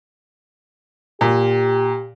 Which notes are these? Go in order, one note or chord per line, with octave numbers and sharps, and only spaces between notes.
A#2 G4